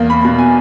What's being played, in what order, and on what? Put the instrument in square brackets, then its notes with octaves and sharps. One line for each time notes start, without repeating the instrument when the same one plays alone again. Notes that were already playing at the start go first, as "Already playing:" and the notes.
Already playing: [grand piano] E2 A#3
B5
B2
G#5